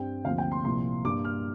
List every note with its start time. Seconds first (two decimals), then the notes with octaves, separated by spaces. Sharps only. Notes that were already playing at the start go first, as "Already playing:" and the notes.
Already playing: G2 G3 C4 G5
0.25 D2 C3 F3 A#3 F5
0.38 G5
0.51 C6
0.64 C2 A#2 F3 A#3 C6
1.05 G2 G3 A#3 D6
1.25 F6